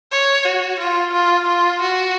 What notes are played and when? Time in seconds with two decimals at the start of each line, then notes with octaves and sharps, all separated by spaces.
0.12 C#5
0.45 F#4
0.80 F4
1.13 F4
1.48 F4
1.82 F#4